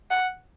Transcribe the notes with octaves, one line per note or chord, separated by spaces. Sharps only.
F#5